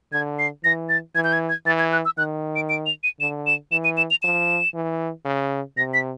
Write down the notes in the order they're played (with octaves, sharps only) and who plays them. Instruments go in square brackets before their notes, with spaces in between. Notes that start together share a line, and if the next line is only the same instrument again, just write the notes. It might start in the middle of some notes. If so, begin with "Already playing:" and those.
[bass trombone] D3 [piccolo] G#6
[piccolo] C7
[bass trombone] E3 [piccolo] A#6
[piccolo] A6
[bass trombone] E3 [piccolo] G#6
[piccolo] G6
G#6
G#6
[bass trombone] E3 [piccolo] A6
[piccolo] G#6
F#6
E6
[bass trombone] D#3 [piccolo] F#6
[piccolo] D7
D7
F7
D#7
[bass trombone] D3 [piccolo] E7
[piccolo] E7
[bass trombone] E3 [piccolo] E7
[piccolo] D#7
E7
F7
[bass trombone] F3 [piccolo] E7
[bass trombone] E3
C#3
[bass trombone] C3 [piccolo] A#6
[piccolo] B6